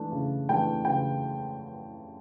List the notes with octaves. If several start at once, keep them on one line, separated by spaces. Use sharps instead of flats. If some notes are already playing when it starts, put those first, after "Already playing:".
Already playing: E3 A3 D4
C#3
E3 A3 D4 G5
C#3 G5